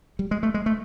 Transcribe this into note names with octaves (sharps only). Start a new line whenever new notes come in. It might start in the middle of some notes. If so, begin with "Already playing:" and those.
G3
G#3
A3
G#3
A3